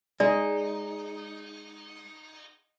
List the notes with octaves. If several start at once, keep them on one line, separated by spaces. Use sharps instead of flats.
G#3 D#4 D5